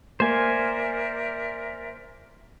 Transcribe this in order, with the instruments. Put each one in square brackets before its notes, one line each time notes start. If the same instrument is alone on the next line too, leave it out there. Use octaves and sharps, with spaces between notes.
[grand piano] A#3 [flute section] A#4 D5 E5 [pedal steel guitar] C5 G#5